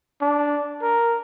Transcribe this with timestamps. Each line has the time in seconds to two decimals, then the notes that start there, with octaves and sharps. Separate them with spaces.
0.21 D4
0.82 A#4